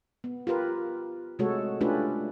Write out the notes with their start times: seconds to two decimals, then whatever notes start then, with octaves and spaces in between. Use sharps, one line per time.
0.24 B3
0.47 F4 G4 A#4 B4
1.39 C3 G#3 A3 F#4 A4 C#5
1.81 A3 C#4 D4 F4 G4 B4